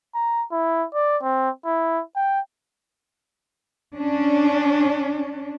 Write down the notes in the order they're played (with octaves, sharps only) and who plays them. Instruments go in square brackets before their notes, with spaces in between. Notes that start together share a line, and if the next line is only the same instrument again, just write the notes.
[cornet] A#5
E4
D5
C4
E4
G5
[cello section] C#4 D4